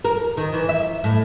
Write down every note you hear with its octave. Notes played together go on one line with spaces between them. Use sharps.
A#4
D#3
E3
E5
A2